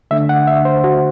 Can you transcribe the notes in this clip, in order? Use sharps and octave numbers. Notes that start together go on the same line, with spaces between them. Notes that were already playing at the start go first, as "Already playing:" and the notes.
D3 A3 D4 E5
F#5
E5
C5
F#4